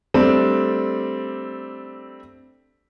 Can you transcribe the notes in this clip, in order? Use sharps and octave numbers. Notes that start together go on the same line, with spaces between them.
G3 A3 C4 D4 A4